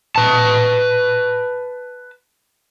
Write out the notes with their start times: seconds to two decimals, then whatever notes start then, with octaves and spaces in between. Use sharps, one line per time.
0.16 B4 A5